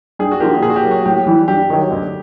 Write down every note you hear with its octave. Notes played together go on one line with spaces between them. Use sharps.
G2 G#4
F#4
D3 F3 A#3 G4
A#2 G#4
F#4
G4
F#3 A#3
F#4
A2 G4
E3 G3
G2 G4
D#3 F#3
D2